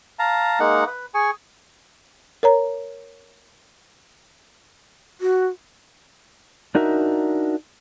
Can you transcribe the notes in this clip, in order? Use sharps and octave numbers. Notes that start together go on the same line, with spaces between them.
F5 A5 A#5
G#3 A#3 D#4 F#5
B4
G#4 G#5 C#6
A#4 C#5 A#5
F#4
D4 D#4 F#4 A#4 E5